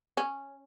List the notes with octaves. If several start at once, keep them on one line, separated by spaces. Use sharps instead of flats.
C#4